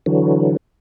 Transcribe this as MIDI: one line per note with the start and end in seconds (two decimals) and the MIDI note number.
0.06 0.57 50
0.06 0.57 52
0.06 0.57 54